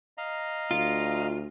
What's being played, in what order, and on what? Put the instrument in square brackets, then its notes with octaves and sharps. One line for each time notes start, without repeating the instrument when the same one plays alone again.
[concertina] D#5 F5 A#5
[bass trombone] D2 [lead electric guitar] F4